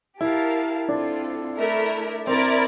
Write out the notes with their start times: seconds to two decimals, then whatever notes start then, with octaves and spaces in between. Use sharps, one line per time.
0.20 E4 G4 A#4 F5 A5
0.89 C4 D4 F4 A4
1.58 A3 E4 A#4 E5
2.27 C4 E4 A#4 D5